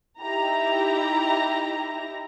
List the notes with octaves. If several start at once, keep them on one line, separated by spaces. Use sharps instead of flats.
D#4 E4 G4 A#5